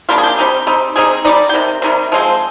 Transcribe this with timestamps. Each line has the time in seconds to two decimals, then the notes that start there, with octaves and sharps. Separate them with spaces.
0.09 G3 A#3 D4 F4
0.18 G#4
0.23 G4
0.38 G3 C4 D#4
0.67 G3 C4 D#4
0.95 G3 C4 D#4 G#4
1.24 G3 C4 D#4 D5
1.49 G5
1.54 C3 D#3
1.82 C3 D#3 G3
2.12 F3 G#3 C4